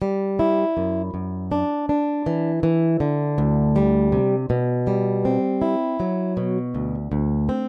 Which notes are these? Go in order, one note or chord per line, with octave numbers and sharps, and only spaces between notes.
G3
E4
F#2
F#2
D4
D4
E3
E3
D3
D2
G3
C3
B2
G3
C4
E4
F#3
B2
D2
D2
C4